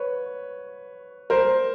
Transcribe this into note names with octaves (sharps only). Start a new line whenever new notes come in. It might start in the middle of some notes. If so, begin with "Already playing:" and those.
Already playing: B4 C#5
A#4 C5